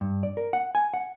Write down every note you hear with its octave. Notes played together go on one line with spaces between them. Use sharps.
G2
D5
A#4
F#5
G#5
F#5